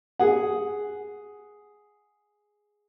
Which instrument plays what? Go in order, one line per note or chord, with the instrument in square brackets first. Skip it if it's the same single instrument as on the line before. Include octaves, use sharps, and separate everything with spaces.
[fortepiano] G#4 F#5